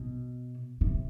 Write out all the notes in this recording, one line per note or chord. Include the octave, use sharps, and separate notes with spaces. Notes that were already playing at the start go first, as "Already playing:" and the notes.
Already playing: B2
C3